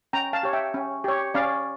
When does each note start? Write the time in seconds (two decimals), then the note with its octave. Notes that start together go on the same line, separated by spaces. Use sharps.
0.13 C#4 G5 A#5
0.33 F5 A5
0.43 G4 C#5
0.53 E5 G5
0.74 C#4
1.04 G4 C#5
1.34 C#4 D5 F5